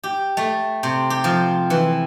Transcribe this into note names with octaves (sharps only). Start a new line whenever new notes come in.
G4
A3
C3
G4
F3
E3